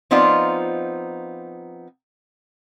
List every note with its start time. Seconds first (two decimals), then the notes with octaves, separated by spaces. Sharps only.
0.11 F3 B3 C4 D#4 F4 D5